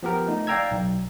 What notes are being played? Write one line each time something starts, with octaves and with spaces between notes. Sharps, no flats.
F3 B3 G4 A#4
A3 D#4
D5 F5 G5 A#5 E6 G#6
B1